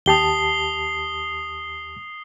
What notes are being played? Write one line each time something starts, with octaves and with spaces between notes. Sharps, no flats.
D#2 G4 A5 D#6 C7 G7